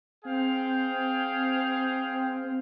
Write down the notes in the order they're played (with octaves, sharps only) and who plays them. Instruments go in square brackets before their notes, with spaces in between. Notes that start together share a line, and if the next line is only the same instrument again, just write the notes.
[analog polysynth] C4 [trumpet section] G#4 F5 G5